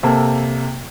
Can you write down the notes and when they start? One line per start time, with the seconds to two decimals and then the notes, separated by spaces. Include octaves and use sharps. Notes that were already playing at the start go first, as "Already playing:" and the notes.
0.03 C3 A#3 A4